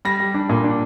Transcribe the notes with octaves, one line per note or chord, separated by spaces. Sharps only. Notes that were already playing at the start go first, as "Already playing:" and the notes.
G3 A#6
G3
D4
A#2
D4